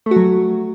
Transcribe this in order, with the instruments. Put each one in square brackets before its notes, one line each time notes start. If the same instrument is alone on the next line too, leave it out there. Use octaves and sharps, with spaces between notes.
[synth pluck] A3
F#4
F#3